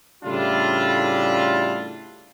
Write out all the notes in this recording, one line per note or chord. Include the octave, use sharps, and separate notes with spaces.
A2 C#3 G3 D4 E4 F4